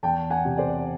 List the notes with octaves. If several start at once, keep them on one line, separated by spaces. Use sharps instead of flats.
E2 G5 A5
F#5 G#5
C3
C5 D5